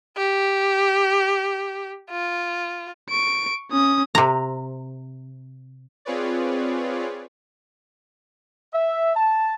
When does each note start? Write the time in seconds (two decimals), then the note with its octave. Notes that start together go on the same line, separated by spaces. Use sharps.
0.17 G4
2.10 F4
3.10 C#6 D7
3.72 C#4 D#6
4.15 C3 A#5
6.05 C4 F4 G#4 B4 C#5 D5
8.73 E5
9.15 A5